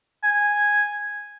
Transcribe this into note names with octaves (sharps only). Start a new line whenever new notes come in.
G#5